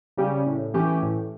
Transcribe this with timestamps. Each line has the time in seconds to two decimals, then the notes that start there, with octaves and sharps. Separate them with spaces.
0.17 C#3 G3 C#4 G4
0.46 A2
0.74 E3 A3 C#4 G4
1.03 A2